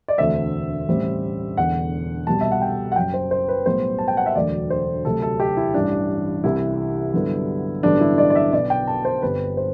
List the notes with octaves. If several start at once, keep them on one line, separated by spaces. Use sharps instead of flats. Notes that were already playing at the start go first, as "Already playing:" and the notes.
D5
E1 D2 D3 A3 C4 E5
A1 A2 G3 C4
E1 E2 D3 F#5
C2 B2 G3 A5
E5
F#5
G5
F#5
F#1 F#2 F#3 G5
C5
C5
B4
B1 A2 G3 B3 C5
A5
G5
F#5
E5
E1 D2 D3 F#3 A3 D5
C5
D2 C3 F#3 A3 A4
A4
G4
E4
A1 G2 E3 D4
C2 C3 E3 E4
G2 D3 F#3 B3
A1 G2 D3 F#3 B3 D4
E4
D5
D5
E5
B1 B2 F#3 B3 D5
G5
A5
C5
G1 G2 D3 G3 C4 B4
C5